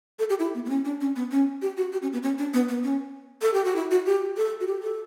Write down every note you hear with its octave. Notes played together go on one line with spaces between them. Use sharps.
A4
G4
E4
B3
B3
C#4
D4
C#4
B3
C#4
G4
F#4
G4
C#4
B3
C#4
D4
B3
B3
C#4
A4
G4
F#4
E4
F#4
G4
A4
F#4
G4
A4